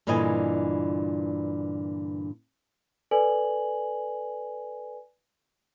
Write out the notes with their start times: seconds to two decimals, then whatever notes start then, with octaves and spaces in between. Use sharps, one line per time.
0.07 G2 A#2 D3 E3 D#5 G#5
3.11 A4 B4 D5 G#5 F#7